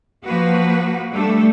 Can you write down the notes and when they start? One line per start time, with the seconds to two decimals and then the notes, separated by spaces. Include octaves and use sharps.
0.25 F3 A#3 F#4 B4
1.11 G3 A3 D4 A4